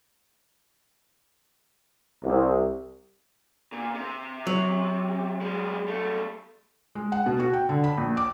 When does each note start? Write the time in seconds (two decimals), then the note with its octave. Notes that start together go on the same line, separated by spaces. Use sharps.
2.24 C2
3.72 A#2
3.94 C3
4.47 F#3
5.41 G3 G#3
5.88 G3 A3
6.95 G#3
7.12 F#5
7.26 B2
7.40 F#4
7.53 G5
7.69 D3
7.84 B5
7.98 A#1
8.17 D6